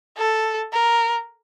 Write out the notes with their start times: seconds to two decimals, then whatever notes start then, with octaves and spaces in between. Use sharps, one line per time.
0.18 A4
0.73 A#4